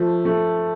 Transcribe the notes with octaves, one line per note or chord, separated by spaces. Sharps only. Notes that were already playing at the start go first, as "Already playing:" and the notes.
Already playing: F3 A3
A3